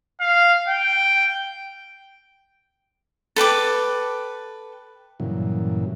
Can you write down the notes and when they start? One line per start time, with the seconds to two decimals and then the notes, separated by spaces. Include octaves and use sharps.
0.20 F5
0.68 G5
3.36 A4 B4 G5 D6
5.20 G2 A#2 C#3 E3 F#3